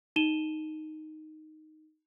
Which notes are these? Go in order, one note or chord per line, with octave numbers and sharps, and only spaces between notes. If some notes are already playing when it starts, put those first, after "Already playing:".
D#4 D#7 E7 G7